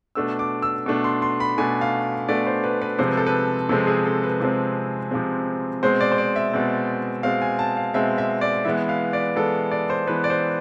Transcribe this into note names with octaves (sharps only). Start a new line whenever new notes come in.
B2 A3 D4 E6
D6
E6
B2 A3 D4
C6
C6
B5
B2 A3 D4 G#5
F5
B2 A3 D4 D5
C5
B4
B4
C3 F3 G#3 C4 C5
B4
A4
B4
C3 F3 G#3 C4 A4
G#4
A4
B4
C3 F3 G#3 C4
C3 F3 G#3 C4
B2 G#3 C4 C5
D5
C5
D5
E5
B2 G#3 C4
B2 G#3 C4 F5
G#5
A5
F5
B2 G#3 C4 E5
E5
D5
E3 G#3 B3 E5
F5
D5
E3 G#3 B3 A4
D5
C5
E3 G#3 B3 B4
D5
C5